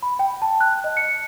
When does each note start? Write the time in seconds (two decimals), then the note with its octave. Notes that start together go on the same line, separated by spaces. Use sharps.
0.03 B5
0.19 G5
0.42 A5
0.61 F#6
0.84 D#5
0.97 C#7